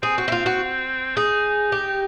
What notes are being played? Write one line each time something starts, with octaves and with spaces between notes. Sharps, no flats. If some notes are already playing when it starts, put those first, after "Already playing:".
C4 G#4
F#4
E4
F4
F#4
D#4 G#4
G4